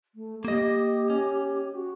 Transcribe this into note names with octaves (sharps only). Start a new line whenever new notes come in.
A3
A#3 G4 D#5
C#4
F#4